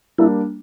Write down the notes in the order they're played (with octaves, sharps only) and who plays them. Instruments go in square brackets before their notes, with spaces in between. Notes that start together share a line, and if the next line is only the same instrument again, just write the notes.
[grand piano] G3 A#3 D4 [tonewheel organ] E4